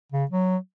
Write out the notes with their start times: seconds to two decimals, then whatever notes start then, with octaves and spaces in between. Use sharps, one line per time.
0.12 C#3
0.31 F#3